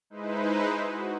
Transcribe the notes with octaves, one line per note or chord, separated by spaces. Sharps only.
G#3 D#4 E4 B4 C5
F#4